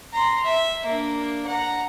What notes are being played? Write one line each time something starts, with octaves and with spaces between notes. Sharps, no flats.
A#5 C6
E5
A#3 D4
F#5 A#5